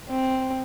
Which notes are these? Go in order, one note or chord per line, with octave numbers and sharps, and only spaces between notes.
C4